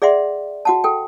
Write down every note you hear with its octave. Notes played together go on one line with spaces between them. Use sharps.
G#4 D5 E5 F#5 C6
F#4 F#5 A5
A4 G5